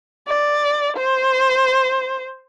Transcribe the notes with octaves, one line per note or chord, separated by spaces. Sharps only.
D5
C5